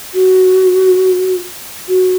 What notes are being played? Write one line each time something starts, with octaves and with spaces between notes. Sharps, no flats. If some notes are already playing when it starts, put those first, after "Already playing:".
F#4
F#4